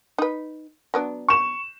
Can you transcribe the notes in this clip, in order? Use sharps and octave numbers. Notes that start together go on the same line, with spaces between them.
D#4 B4
F#3 B3 D4
C#6 E7